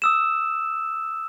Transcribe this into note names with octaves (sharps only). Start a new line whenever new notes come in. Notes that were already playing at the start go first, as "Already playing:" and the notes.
D#6 E6 E7